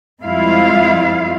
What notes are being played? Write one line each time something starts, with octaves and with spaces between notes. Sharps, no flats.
F2 G3 G#3 E4 F4 F5